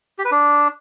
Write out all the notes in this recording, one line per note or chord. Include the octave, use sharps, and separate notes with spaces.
G4
B4
D4